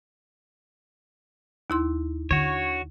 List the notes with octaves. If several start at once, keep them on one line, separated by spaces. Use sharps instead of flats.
D#2 E4 C6
D3 F#4 C#5